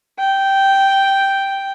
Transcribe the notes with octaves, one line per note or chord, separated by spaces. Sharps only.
G5